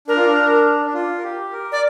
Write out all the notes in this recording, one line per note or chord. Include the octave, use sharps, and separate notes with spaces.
D4 A#4
F4
D4
D4
F4
A#4
G4
A#4
D5